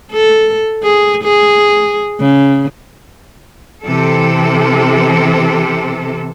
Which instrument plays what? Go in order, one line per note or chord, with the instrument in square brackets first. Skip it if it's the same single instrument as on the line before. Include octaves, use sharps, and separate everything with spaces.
[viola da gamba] A4
G#4
G#4
C#3
[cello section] C3 E3 A4